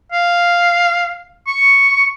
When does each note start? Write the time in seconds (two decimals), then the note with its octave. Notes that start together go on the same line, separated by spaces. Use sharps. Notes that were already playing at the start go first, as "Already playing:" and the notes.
0.12 F5
1.47 C#6